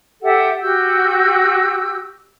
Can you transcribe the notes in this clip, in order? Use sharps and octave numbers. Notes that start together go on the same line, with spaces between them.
G4 A4 E5 F#5
F#4 G4 E6 G6